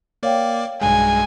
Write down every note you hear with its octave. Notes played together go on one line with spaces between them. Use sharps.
A#3 C#5 D5 F5 G5
B1 G2 G#3 G#5